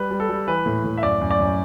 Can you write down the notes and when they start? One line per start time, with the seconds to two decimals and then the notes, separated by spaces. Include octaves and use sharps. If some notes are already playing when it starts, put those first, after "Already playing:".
Already playing: G3 B4
0.11 G3
0.20 A4
0.29 G3
0.48 E3 B4
0.66 A2
0.84 A2
0.97 E5
1.03 F#2 D5
1.21 F#2
1.31 D5
1.40 F#2